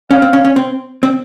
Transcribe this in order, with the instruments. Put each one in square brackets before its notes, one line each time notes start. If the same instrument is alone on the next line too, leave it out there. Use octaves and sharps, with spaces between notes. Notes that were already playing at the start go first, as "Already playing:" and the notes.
[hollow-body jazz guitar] C#4 [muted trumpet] F5
[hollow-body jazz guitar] C4
C#4
C#4
C4
C4